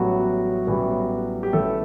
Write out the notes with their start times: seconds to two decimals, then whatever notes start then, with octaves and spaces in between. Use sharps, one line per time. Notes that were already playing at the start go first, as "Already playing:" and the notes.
Already playing: A1 A2 E3 F#3 G3 B3 F#4
0.67 A1 A2 E3 G3 B3
1.43 G4
1.53 A1 A2 E3 G3 A3 B3 A4